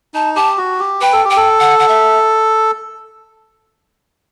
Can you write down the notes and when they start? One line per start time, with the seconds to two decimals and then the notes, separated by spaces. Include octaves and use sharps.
0.14 D#4 A5
0.36 G4 A5
0.57 F#4
0.79 G4
1.01 B4 G5
1.13 A4
1.25 G4
1.30 G5
1.37 A4
1.60 F#5
1.79 F#5
1.88 E5